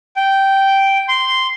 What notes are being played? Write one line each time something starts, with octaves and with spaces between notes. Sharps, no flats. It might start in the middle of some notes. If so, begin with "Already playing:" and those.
G5
C6